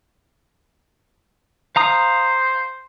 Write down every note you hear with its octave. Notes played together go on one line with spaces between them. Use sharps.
C5 F5 A#5 D#6